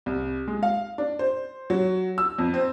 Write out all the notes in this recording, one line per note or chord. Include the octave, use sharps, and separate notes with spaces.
C2
G#3
F5
D4
C5
F#3
E6
F2
C4